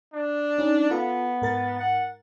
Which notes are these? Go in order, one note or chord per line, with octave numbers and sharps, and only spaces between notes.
D4
C#4 D#4
B3 F4 A4 A5
G#2 A#4 A6
F#5